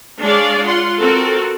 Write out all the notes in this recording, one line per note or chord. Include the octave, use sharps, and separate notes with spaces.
G#3 D4 G#4 C#5 D5 F5
F4 F#5 C6
C4 F#4 A4 A#4